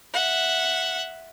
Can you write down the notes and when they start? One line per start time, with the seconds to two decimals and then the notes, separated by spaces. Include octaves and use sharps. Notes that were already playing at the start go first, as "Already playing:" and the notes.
0.14 E5 F#5